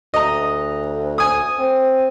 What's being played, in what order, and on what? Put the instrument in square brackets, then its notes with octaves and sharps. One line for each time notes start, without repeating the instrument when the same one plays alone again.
[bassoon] D2 [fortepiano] D#5 A#5
[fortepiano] G#5 D#6
[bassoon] C4